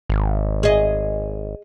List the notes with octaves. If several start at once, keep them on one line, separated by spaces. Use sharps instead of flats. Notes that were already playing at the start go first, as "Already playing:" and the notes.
G#1
G#4 D#5